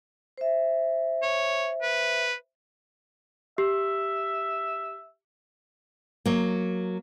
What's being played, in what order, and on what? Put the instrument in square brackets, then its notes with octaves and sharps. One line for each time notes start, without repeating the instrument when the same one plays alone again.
[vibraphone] C5 E5
[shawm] C#5
B4
[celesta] G4 [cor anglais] E5
[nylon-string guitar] F#3 A#3